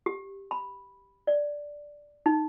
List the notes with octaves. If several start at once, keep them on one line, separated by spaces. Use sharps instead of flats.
G4
B5
D5
D#4